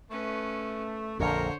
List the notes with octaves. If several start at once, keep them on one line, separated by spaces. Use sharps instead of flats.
A3 C#4 B4
A#1 F2 D3 A#4 C5 C#5